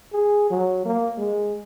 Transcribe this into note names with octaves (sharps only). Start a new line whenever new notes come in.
G#4
F#3
A#3
G#3